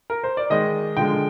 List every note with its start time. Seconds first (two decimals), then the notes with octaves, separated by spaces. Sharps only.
0.10 A#4
0.24 C5
0.37 D5
0.50 D#3 G#3 D#5
0.97 D3 F3 G#3 G5